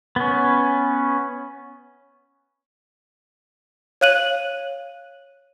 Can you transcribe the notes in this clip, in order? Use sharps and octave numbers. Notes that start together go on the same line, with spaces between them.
B3 C#4
C#5 F5 F#6 D#7 F#7